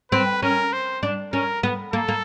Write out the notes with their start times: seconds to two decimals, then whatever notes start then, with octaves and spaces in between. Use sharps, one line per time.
0.12 C4 B4
0.42 C#4 A#4
0.73 C5
1.03 D4
1.33 C#4 A#4
1.63 B3
1.93 A#3 A4
2.08 A#3